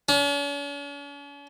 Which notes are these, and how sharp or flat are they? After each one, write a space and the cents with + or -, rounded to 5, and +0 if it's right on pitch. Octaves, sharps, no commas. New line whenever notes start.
C#4 +45